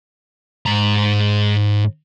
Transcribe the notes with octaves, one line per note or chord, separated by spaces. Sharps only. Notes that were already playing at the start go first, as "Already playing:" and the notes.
G#2 A#5